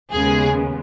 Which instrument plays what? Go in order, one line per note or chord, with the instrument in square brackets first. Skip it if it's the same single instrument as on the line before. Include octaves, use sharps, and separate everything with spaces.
[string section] D#2 C#3 G#3 B3 G#4